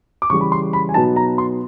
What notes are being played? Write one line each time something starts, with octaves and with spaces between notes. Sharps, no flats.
D6
C#3 E3 G3 C#6
B5
C6
B5
G#5
B2 F#3 B3 D#4 A5
A#5
C6